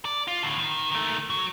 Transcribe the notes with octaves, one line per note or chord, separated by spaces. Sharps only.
D5
F4
A2 D3
D#3
D#3 A3
F#3